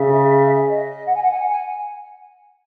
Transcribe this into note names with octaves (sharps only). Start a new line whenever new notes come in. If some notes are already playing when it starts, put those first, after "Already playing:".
Already playing: C#3 E5
D#5
F#5
G#5
F#5
G#5
F#5
G#5